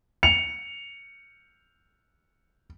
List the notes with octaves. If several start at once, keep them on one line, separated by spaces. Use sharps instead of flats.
C#7 F7